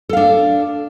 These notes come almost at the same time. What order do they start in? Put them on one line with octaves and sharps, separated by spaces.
A4 F5 D4